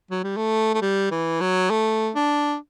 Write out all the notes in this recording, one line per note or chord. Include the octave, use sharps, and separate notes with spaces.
F#3
G3
A3
A3
G3
E3
F#3
A3
D4